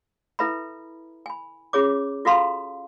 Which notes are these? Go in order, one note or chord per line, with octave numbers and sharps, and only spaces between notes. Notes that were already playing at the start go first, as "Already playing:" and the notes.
E4 A4 B4 E5 A#5 B5
G#5 B5
C#4 F4 G#4 C#5 D6
F4 F#4 A4 F5 A#5 C6